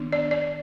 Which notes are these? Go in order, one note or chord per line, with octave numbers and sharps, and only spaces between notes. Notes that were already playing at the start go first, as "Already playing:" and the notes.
Already playing: D#3 B3 D4
D5
D5